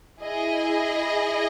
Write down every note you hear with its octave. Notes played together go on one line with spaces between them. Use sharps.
E4 G#4 D#5